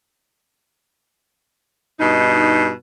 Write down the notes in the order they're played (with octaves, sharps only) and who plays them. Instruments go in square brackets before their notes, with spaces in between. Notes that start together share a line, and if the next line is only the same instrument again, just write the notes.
[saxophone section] G2 B2 D#4